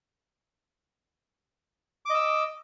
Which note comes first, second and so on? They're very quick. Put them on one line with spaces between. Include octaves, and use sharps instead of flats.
D6 D#5 E6